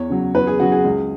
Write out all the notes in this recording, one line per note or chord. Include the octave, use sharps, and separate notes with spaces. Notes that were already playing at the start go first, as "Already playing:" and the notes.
Already playing: E2 C#5
C#3 F#3
E2 B4
G#4
C#3 F#3 F#4
G#4
C#2